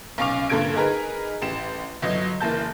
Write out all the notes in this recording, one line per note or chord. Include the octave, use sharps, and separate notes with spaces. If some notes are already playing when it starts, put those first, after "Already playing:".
B1 C#4 F5 C#6 D6 F7
G2 A#2 D3 A4 G#6 D7
D#4 G#4 A#4 B4
A1 G4 E7
G1 F#3 D#5
F#1 E3 A#3 A5 G6